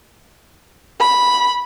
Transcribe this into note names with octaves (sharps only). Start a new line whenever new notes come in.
B5